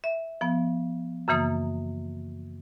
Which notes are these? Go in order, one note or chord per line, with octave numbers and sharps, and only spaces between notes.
E5
F3 B3
F#2 C#3 E3 A#3 D#6